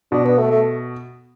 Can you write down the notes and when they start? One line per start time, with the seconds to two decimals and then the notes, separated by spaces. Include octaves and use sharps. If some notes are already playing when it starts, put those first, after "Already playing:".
0.12 B2 D4
0.25 B3
0.38 A3
0.51 A3